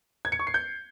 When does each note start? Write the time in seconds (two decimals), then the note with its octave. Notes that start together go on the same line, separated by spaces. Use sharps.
0.25 G#6
0.32 C#7
0.39 C#6
0.47 C7
0.54 G6